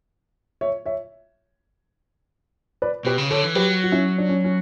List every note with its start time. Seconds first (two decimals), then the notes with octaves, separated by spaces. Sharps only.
0.61 C#5 E5
0.86 C#5 E5
2.82 B4 D5
3.05 B2 G4 B4
3.18 C#3
3.30 D3 A4 C#5
3.43 E3
3.55 F#3 G4 B4
3.84 F#4
3.92 C#4 E4
4.18 D4
4.29 C#4
4.44 C#4